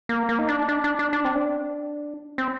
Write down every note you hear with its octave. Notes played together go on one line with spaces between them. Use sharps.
A#3
A#3
D#4
D4
D4
D4
D4
D4
C4
D4
C4